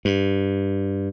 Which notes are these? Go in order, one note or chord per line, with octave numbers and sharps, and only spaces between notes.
G2